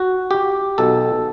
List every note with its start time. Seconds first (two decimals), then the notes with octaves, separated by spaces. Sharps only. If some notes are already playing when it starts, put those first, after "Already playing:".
Already playing: F#4
0.31 G4
0.78 B1 B2 A4